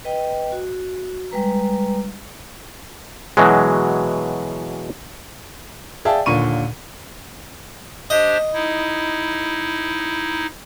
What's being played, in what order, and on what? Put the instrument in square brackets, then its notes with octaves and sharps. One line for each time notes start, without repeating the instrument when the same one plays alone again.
[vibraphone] B4 D#5 G5
F#4
G3 G#3 B4 A#5
[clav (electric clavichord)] B2 E3 F#3 G#3
[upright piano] G#4 D5 E5 F5 G5 A5
D#2 A#2 D3 C#6 D#7
[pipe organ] D4 G4 C5 [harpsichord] D#5
[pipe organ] D#4 E4